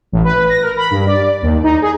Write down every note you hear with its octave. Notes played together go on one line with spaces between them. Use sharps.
A1
B4
A#6
A#4
B5
G2
D5
D#2
D#4
G#4